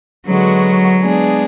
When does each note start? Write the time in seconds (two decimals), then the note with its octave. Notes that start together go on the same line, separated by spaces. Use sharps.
0.26 D3 F#3 G#3 B3 F#4
1.01 G#3 B3 D4 G#4